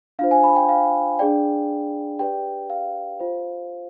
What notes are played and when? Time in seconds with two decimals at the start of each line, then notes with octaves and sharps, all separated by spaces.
0.19 D4 F4 C5 F5
0.31 G#5
0.44 B5
0.56 G5
0.69 F5
1.19 D4 G#4 D5 G5
2.19 G4 B4 D5 G5
2.70 F5
3.20 F4 C5